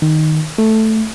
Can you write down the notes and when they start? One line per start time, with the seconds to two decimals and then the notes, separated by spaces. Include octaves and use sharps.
0.02 D#3
0.58 A3